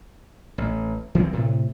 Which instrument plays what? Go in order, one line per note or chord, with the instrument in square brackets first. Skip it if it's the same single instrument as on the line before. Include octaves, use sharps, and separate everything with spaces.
[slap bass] A1
E3 F#3 A#3 C4
A2 C3